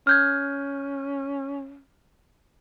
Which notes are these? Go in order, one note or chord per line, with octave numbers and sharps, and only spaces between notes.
C#4 F6 G6 G#6